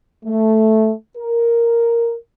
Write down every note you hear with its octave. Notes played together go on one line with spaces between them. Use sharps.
A3
A#4